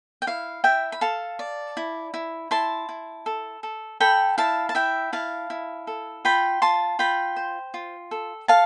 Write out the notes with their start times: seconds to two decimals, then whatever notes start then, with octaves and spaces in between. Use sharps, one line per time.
0.22 G5
0.27 E4 F5
0.64 E4 E5 G5
0.92 B5
1.01 A4 F5 A5
1.39 D5
1.77 E4
2.14 E4
2.51 E4 A5 C6
2.89 E4
3.26 A4
3.63 A4
4.00 A4 G5 B5
4.38 E4 F5 A5
4.69 A5
4.75 E4 E5 G5
5.13 E4 F5 A5
5.50 E4
5.87 A4
6.25 F4 G5 B5
6.62 F4 A5 C6
6.99 F4 G5 B5
7.36 C5
7.74 F4
8.11 A4
8.48 A4 F5 A5